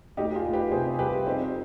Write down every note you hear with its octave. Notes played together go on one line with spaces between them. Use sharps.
D2 D#4 G4
F4 G#4
D2
G4 B4
C3 G#4 C5
G#4
G3 G4 B4
F2 C4 D#4